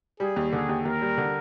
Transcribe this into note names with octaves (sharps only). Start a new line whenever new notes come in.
G3 G#4
D#2
D3 G#4
D#2
D#2 A#4
G3
D3